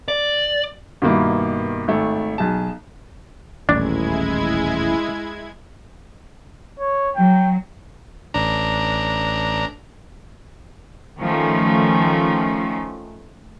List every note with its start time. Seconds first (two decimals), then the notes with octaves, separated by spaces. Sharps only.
0.08 D5
1.02 G2 B2 D#3 A#3 E4
1.88 G#1 A3
2.38 B1 G#4 A5
3.69 D#1 A1 G#3 D4 E4 G#6
6.80 C#5
7.16 F#3 G5
8.34 A1 D4 A#5
11.19 D#3 F3 A3 C#4